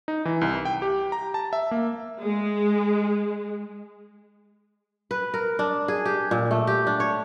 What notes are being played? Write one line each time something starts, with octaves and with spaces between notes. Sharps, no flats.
D#4
E3
C2
G5
G4
A#5
A5
E5
A#3
G#3
B4
A#4
D4
G#4
G4
A#2
A3
G4
D4
C#5